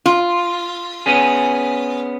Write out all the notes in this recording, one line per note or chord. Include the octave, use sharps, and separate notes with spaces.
F4
B3 C#4 G#4